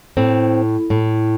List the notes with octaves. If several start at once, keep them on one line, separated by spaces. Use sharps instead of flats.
A2 C4
A2